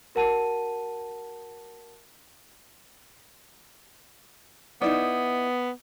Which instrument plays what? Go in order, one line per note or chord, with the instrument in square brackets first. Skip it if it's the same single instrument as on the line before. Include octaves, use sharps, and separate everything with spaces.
[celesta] F#4 A#4 F#5 A5 D#7
[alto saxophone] B3 [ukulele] D#4 E4 D5